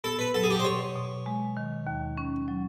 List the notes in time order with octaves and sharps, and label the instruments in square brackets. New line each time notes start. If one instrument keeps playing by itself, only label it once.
[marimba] B3 [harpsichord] A4
[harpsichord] B4
[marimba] F#3 [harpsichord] A4
[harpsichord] G#4
G4
C5
[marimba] B2 [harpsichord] C#5
[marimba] B2
G#3
D#3
D#2
C#4
F#3